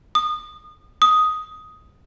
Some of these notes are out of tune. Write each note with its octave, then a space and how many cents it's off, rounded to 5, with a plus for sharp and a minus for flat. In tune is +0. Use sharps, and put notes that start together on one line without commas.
D#6 -30
D#6 +5